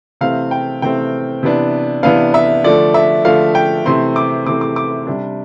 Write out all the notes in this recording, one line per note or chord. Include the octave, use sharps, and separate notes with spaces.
C3 E3 A3 C4 F5
G5
C3 E3 A3 C4 G5
C3 E3 B3 D4
C3 E3 B3 D4 F5
E5
D3 F3 A3 D5
E5
D3 F3 A3 F5
G5
C3 E3 A3 C4 C6
D6
C3 E3 A3 C4 D6
D6
D6
C3 G3 D4